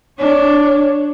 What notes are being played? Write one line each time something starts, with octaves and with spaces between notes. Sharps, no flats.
D4 C#5